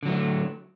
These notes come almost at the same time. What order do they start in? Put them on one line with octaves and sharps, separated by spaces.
D3 F#3 A3